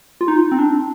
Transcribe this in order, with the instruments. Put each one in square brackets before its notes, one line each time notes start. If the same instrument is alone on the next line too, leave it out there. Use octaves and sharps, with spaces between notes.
[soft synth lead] F4
D#4
C4
D4